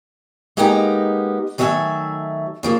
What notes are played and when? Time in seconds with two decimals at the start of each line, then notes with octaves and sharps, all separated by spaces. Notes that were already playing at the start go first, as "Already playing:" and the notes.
0.57 G#3 A#3 B3 D#4 G4 A#5
1.58 D#3 F#3 A3 G#4 E5 G#5
2.63 C#3 F3 A#3